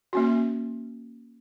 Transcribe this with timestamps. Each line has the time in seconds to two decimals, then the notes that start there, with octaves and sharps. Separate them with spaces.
0.13 A#3 C#4 F#4